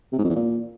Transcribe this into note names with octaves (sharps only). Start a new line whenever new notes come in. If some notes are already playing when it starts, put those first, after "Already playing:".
C3
G#2
F2
E2
A#2